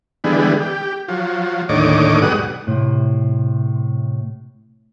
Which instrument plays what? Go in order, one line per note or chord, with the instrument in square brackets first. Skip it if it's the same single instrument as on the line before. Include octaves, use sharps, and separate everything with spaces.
[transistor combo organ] D3 E3 G3 G#3 B3
G4
F3 F#3
D#2 A2 D3 C#5 D#5 D6
G#2 B2 F#3 G3 F#5 D#6
[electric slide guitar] A2 C3